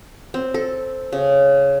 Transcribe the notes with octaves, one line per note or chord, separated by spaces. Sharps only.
C4
A4
C#3